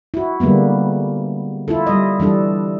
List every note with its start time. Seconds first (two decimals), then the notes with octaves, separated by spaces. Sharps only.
0.14 E4 F#4
0.40 D3 G3 G#3 A#3 B3
1.68 E4 F4 A4
1.87 G3 D#5
2.20 E3 G3 D4 A4